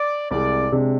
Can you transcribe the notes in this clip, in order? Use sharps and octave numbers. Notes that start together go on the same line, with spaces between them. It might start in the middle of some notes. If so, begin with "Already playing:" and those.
Already playing: D5
C2 C3 G#3 D5
C3 G#3 D4